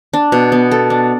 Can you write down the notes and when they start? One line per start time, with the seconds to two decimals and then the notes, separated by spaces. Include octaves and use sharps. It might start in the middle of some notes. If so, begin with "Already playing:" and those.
0.13 D4
0.32 B2
0.52 B3
0.71 A4
0.90 D4